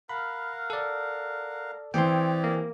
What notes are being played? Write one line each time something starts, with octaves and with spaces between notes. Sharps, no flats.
A#4 F5 F#5 B5
A4 D5
E3 C4 G4 G#4 D5 G5 C6
A#3